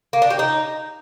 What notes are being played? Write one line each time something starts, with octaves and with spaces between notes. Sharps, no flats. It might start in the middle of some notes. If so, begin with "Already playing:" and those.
A#3
D4
G4
D#4